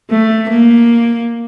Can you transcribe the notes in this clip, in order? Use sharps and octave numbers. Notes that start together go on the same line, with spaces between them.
A3
A#3